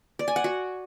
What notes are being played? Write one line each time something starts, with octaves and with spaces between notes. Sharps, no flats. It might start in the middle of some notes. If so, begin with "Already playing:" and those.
D5
G#5
F#5
F#4